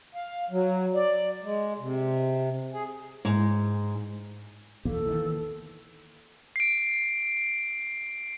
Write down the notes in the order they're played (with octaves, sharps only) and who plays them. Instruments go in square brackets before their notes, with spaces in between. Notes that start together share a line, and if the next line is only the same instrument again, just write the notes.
[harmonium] F5
F#3
D5
G#3
C3
G#4
[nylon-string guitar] G#2
[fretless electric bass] A#1 E2 B2 [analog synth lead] A#3 [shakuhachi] A4
[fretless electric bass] D#3 E3
[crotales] C7 D7